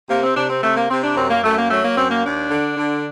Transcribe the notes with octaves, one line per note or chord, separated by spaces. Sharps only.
C3 A#3
C4
C3 D4
C4
C3 A3
A#3
C3 C4
D4
F#2 C4
A#3
F#2 A3
A#3
F#3 A3
A#3
F#2 C4
A#3
D#2 D4
D3
D3